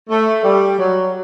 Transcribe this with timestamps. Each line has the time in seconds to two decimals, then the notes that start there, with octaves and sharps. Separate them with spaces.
0.09 A3
0.43 G3
0.77 F#3